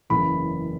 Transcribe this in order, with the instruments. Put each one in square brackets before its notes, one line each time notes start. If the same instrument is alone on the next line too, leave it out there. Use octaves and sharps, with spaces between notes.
[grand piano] F#1 E2 C#3 E3 B5